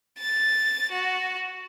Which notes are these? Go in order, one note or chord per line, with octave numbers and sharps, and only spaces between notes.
A6
F#4